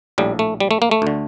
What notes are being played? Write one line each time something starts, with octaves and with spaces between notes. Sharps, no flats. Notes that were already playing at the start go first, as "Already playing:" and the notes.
A#1 A2 G3
A3
G3
A3
A#3
A3
D2 D3